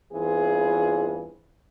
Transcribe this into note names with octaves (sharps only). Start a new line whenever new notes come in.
E2 G2 E3 C4 F4 G#4